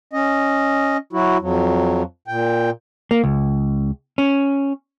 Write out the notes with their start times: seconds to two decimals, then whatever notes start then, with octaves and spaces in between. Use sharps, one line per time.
0.13 C#4 D#5
1.13 F#3 E4 F#4
1.41 F2 F#3
2.28 A#2 G5
3.11 A#3
3.24 C#2
4.18 C#4